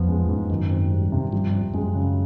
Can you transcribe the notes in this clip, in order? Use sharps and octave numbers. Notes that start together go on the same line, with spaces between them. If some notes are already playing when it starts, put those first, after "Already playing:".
Already playing: F2 F3 B3
G#3
G#2
F#2 D#3
C4
G3
C3
G2 F3
C4
F#2 G#3
C#3